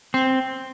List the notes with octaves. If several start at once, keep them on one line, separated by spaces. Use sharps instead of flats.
C4